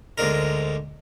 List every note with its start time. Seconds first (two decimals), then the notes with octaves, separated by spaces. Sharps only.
0.18 D2 G#2 D4 A#4